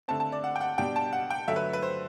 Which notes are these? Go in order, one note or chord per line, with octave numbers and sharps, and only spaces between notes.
D3 A3 C4 A5
A5
D5
F#5
G5
F#5
B2 G3 D4 G5
A5
F#5
G5
D3 F#3 A3 E5
B4
B4
C5